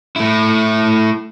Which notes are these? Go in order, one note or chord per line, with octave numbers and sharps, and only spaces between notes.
A3 E4